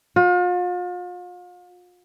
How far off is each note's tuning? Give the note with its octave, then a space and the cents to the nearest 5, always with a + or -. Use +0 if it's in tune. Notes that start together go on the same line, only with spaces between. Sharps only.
F4 +40